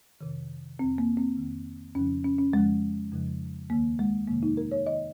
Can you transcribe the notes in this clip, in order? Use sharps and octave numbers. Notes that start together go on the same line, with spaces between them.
F2 C3 D#3
F2 D#3 C4
A#3
C4
F2 D#3
F2 C#3 F3 C#4
C#4
C#4
F2 C#3 F3 G#3
F2 C#3 F3
D#2 D#3 A#3
G#3
F2 C3 D#3 A#3
D#4
A#4
C#5
D#3 D#5